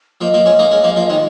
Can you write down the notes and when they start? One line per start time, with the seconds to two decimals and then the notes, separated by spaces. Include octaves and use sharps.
0.21 F3 A#3 D#5
0.34 F3 A#3
0.46 G#3 C#4
0.59 A#3 D#4
0.71 G#3 C#4
0.84 F3 A#3
0.96 F3 A#3
1.09 D#3 G#3